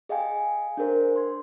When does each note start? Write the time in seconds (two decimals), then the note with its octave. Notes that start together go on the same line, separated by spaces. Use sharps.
0.09 G#4 D#5 F5 G5 G#5
0.77 D4 G#4 A#4 C5
1.16 C6 G#6